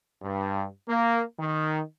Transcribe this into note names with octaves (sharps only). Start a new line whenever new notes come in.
G2
A#3
D#3